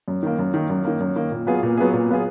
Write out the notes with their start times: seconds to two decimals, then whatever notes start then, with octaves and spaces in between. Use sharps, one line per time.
0.08 F#2
0.23 D#3 A#3
0.39 F#2
0.54 D#3 A#3
0.69 F#2
0.85 D#3 A#3
1.00 F#2
1.16 D#3 A#3
1.31 A#2
1.47 F#3 B3 F4 G#4
1.63 A#2
1.77 F#3 B3 F4 G#4
1.93 A#2
2.09 F#3 B3 F4 G#4